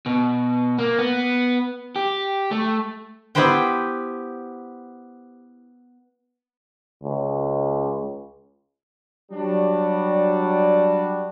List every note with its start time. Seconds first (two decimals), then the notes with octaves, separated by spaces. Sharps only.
0.06 B2
0.79 A#3
0.99 B3
1.96 G4
2.51 A3
3.35 B3 E4 G4 B4 C5 G5
7.03 C#2
9.32 F#3 G3 D4 F#4